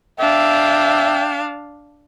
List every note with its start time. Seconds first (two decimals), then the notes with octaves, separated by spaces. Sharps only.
0.20 D4 E5 F5 G5